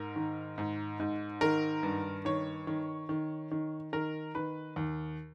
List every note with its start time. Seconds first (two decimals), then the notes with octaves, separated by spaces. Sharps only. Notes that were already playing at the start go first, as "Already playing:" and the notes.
Already playing: G#2 A#4
0.16 D#3
0.58 G#2
1.00 G#2
1.41 D#3 A#4
1.83 G2
2.25 D#3 C#5
2.67 D#3
3.09 D#3
3.51 D#3
3.93 D#3 A#4
4.35 D#3 B4
4.76 D#2